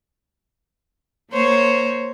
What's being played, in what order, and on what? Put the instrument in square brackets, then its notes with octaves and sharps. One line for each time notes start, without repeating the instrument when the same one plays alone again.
[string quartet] A#3 C5 C#5